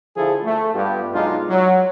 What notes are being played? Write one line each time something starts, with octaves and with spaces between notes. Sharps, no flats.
D3 F3 E4 G#4 A4
A3
G2 G3 B3 F4 G4
B1 G#3 D4 D#4 F4
F#3